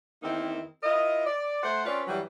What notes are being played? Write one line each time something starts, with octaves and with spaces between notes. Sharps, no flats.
E2 D#3 A#3 C4 D#4 E4
E4 F4 A#4 D#5
D5
A3 C5 F#5
C4 C#4 F4 B4 D5
G2 E3 F#3 G3